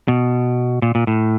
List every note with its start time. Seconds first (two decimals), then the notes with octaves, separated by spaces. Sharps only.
0.08 B2
0.82 A#2
0.95 A#2
1.07 A2